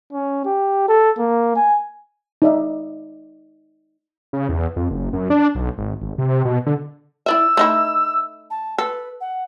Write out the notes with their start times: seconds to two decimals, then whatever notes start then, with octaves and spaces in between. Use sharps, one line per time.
0.13 C#4
0.46 G4
0.88 A4
1.19 A#3
1.56 G#5
2.42 D#4 D5 E5
4.33 C#3
4.49 E2
4.76 F2
4.90 F#1
5.13 F#2
5.30 D4
5.55 B1
5.78 G#1
6.02 G#1
6.18 C3
6.45 B2
6.66 D3
7.26 E4 D5 E5 E6
7.57 A3 D#4 E4
8.50 A5
8.78 A4 B4
9.20 F#5